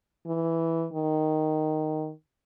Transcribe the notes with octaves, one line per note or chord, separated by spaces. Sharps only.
E3
D#3